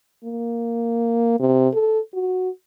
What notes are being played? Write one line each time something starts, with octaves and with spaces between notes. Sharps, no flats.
A#3
C3
A4
F#4